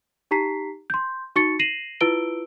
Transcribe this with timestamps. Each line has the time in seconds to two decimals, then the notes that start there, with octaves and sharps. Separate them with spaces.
0.31 D#4 G4 A#5 B6 C7
0.90 C6 G6
1.36 D#4 F#4 C#6 A6 C#7
1.59 A#6 C7 D#7 E7 F#7
2.01 E4 F4 B4 E6 D7 G7